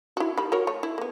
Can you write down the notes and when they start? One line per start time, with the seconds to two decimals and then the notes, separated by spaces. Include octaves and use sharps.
0.17 E4 F#4
0.37 D#3 G3 B5
0.52 F#4 A#4 C#5
0.67 A3 C#5
0.83 E4
0.98 A#3 B3